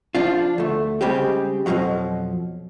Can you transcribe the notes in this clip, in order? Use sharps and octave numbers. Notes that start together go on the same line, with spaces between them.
F3 D4 F4
D2 A3
C#3 G3 G#3 C4 G4
F2 G#2 B2 F3 F#3